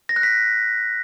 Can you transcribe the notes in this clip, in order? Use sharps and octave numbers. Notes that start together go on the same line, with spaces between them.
A#6
F#6
B6